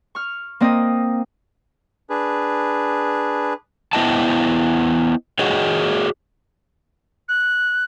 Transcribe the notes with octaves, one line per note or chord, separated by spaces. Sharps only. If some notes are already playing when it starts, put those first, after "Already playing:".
C#6 F6
A#3 C4 D#5
D4 G#4 B4
B3 E4 C5 D#5 G5 A5
F#4 G#4 C#5 D#5
F#6